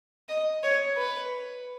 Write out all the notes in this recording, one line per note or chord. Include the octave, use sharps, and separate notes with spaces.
D#5
C#5
B4